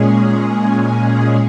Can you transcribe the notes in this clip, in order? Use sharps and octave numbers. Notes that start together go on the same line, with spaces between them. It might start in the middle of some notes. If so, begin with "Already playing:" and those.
Already playing: A#2 G#3 C#4 G#4